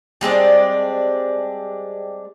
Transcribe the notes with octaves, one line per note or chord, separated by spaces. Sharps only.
G3 G#3 C4 D4